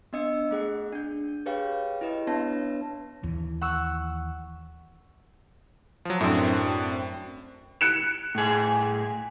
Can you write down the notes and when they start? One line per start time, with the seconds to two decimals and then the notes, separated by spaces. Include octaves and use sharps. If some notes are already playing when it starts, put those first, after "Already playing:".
0.13 B3 D4 D#5 E6 C#7
0.51 A3 G#4 F#5
0.92 D4 G6
1.46 G4 G#4 B4 C#5 F5 G5
2.01 E4 G4 B4 D#5
2.27 B3 D4 B4 C#5 A5 A#6
3.23 D#2 E3
3.61 F#5 C#6 E6
6.05 F3 F#3
6.21 F#2 A2 C4 D4
7.81 F#6 C#7 E7
8.35 A2 G#4